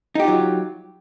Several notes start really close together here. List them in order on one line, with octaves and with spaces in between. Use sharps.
D#4 G4 F4 F#3